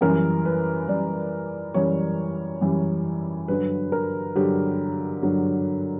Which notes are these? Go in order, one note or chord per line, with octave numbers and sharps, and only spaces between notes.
F#2 E3 G3 A#4
B4
F#2 E3 G3 D5
F#2 E3 G3 C#5
F#2 E3 G3
G2 D3 F#3 B4
A#4
G2 D3 F#3 G4
G2 D3 F#3